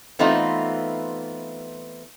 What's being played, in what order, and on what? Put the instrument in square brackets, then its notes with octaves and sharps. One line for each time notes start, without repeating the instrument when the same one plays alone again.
[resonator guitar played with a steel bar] E3 A3 B3 C4 D#4 F4